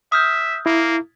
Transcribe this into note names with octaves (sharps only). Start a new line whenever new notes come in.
E5 D#6 F6 G6
A#3 E4